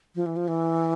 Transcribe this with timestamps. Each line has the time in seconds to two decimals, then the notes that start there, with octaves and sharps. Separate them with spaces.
0.15 F3
0.26 E3
0.37 F3
0.48 E3